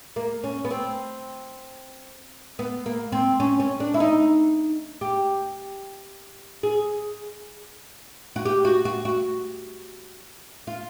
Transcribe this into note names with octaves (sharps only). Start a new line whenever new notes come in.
A#3
C#4
B3
C4
B3
A#3
C4
C#4
C#4
D4
E4
D#4
G4
G#4
F#4
G4
F#4
F#4
F#4
F4